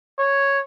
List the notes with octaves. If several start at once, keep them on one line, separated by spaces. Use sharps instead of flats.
C#5